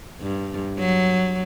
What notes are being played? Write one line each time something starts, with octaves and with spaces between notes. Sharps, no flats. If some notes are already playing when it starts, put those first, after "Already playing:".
G2
F#3